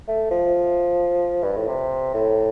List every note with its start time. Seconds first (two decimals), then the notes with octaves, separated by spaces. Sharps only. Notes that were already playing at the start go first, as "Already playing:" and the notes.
0.08 A3
0.31 F3
1.44 G2
1.56 A2
1.68 C3
2.14 A2